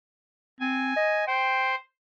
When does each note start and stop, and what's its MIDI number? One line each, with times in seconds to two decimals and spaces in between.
0.60 0.95 60
0.60 1.24 80
0.96 1.24 75
1.27 1.75 72
1.27 1.74 79